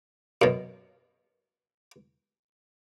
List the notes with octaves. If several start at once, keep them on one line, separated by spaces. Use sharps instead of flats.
F#2 B2